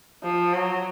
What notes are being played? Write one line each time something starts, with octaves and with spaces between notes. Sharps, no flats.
F3
F#3